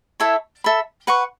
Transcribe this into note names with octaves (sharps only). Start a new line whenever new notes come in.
E4 A4 C#5 E5
A4 E5 B5
B4 F#5 C#6